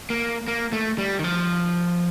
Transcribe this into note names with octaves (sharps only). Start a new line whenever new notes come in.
A#3
A#3
A3
G3
D#3
F3